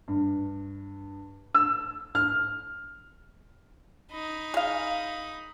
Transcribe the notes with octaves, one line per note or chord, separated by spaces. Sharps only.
G2
E6
F6
D#4 B5
G#4 F5